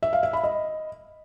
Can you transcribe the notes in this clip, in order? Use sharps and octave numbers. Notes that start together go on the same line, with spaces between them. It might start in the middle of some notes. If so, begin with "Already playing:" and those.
E5
F5
E5
B5
D#5